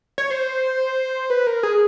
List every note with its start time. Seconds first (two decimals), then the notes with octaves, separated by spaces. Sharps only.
0.18 C#5
0.31 C5
1.30 B4
1.47 A#4
1.63 G#4